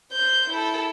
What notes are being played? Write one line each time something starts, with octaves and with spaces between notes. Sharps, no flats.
C5 G6
E4 A4